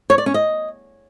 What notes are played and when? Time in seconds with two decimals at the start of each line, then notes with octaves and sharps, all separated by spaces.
0.10 C#5
0.18 D5
0.26 C#4
0.34 D#5